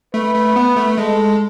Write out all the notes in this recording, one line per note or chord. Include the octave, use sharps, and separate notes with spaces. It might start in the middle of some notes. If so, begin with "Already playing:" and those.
A3 B4
A3
B3
A3
G#3 A4